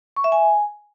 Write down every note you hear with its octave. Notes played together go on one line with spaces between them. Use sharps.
C#6
E5
G#5